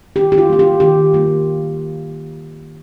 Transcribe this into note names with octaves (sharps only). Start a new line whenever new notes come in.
D#3 G4
G4
F4
G3 A#3 F4
G4
D#3 G4
G3 A#3 F4